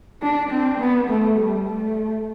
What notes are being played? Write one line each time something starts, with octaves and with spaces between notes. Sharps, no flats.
D4
C4
B3
A3
G3
A3